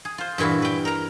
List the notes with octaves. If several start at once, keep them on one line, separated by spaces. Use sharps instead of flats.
G#4
F4 C5
G2 A#2 E3 E4 F#4
B4 G5
A#4 A#5